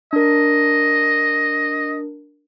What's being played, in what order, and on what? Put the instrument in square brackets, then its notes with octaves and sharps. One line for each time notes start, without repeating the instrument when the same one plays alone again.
[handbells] D4 A#4 [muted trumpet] D#5